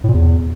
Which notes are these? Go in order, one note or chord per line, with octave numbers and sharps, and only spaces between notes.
A2
A#2
E2